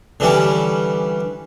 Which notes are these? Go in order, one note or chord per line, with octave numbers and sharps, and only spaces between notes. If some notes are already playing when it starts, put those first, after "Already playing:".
D3 E3 G3 C#4